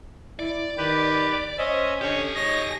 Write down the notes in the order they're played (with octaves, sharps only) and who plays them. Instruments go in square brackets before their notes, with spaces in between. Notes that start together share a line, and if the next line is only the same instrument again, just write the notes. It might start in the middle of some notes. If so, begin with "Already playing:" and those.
[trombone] E4 [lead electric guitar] D5
[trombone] D#3 [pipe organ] G4 B4
[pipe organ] C#4 E5 [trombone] C5 [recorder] D#5
[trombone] D3 [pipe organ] C#4 C#5 [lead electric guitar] G4 G#5
[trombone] G#2 [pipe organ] C#5 D#5 [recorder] A#6